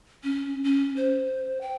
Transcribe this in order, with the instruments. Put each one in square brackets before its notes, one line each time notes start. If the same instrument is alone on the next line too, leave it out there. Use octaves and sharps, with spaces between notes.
[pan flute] C#4
C#4
C5
G5